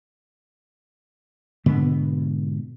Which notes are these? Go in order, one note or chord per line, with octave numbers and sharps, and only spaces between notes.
G#2 B2 D3 B3